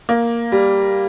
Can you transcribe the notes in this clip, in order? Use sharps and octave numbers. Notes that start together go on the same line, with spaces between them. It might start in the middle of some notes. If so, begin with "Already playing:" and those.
A#3
G3